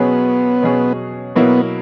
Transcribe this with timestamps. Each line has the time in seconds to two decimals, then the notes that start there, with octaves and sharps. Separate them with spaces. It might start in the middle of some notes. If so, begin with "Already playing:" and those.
Already playing: B2 F#3 B3 C#4 G#4
0.63 B2 F#3 C#4 G#4
1.36 B2 F#3 A#3 B3 E4